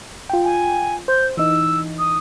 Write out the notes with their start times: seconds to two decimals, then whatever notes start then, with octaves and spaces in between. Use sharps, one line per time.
0.30 F4 G5
0.44 G#5
1.08 C5 G6
1.37 E3 D#4 E6
1.98 D#6